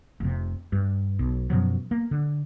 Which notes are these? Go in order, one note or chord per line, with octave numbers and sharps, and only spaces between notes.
F1 C3
G2
B1
F#2 B2 F3 F#3
A#3
D3